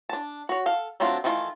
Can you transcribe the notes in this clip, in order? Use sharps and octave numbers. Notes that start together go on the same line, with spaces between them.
D4 A5
F#4 C#5
A4 F5
F#3 A3 C4 D4 F4
D#3 E3 A3 F4